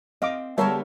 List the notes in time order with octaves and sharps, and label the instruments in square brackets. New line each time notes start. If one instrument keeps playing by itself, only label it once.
[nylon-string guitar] C4 [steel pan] D#5 F5 D6
[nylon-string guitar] D3 G#3 B3 [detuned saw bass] G3 [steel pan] A#4 C#5 E5 [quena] A5